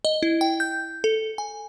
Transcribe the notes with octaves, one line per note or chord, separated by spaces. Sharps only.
D#5
E4
G5
G6
A4
G#5